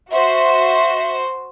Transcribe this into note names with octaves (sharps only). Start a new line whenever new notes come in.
F#4 C5 E5